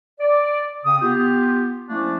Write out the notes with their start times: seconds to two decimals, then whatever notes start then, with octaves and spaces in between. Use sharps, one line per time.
0.20 D5
0.85 C#3 C4 D#6
1.02 B3 F4 G4
1.89 F3 A3 A#3 C#4 D4 E4